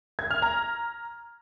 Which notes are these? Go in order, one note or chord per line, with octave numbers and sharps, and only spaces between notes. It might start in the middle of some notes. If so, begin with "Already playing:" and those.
G#6
F6
A#5